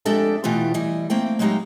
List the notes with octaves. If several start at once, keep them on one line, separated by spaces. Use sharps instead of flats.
F2 G#3 D4 G4 A4 E5
B2 E3 A3 F4 G4
E3 G3 D#5
A3 A#3 C4 G5
F#3 G#3 A#3 D#4 E4 G4